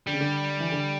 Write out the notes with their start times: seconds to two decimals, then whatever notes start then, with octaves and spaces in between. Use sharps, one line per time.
0.07 D3 G3
0.13 C#3
0.21 D3
0.60 E3
0.72 D3